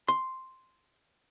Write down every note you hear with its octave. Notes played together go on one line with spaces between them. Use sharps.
C6